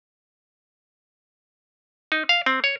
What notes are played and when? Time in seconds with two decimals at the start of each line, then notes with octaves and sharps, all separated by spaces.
2.12 D#4
2.29 F5
2.46 C4
2.64 C#5